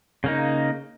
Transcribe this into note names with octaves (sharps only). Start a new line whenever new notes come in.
C#3 A#3 D#4